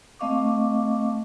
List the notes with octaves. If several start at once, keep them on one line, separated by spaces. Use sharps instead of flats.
A3 C4 D#5 F5 C#6 D6